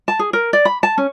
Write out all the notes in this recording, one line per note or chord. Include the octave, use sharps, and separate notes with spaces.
A5
G#4
A#4
D5
B5
A5
C#4